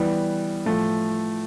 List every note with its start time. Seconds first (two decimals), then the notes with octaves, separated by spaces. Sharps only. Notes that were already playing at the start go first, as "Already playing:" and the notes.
Already playing: E3 G3 B3
0.66 A2 F3 A3